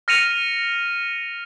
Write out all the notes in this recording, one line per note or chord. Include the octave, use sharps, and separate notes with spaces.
F6 A#6 C#7 D#7 F7